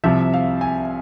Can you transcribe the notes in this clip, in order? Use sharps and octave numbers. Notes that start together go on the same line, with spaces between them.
C2 C3 F3 E5
F5
G#5